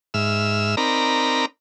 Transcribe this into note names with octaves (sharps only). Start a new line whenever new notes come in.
G#2 E5 E6 F6
C4 D#4 A#4 D5 A#5 B5